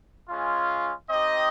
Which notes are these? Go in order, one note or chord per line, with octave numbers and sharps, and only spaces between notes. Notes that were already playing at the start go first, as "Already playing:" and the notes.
G#3 C#4 F4
C4 D#4 G4 D#5